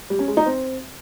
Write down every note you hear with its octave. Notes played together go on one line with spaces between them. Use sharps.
G3
C#4
G#3
D#4
C4